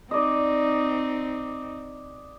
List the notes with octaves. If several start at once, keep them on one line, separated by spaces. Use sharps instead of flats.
C4 D#4 D5 D#5